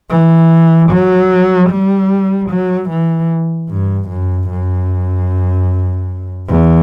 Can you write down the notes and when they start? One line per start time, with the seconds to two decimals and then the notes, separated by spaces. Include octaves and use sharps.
0.10 E3
0.90 F#3
1.70 G3
2.50 F#3
2.89 E3
3.69 G2
4.10 F#2
4.50 F#2
6.48 E2